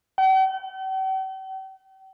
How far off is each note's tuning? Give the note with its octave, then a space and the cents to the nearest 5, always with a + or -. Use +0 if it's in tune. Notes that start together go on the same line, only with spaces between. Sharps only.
G5 -45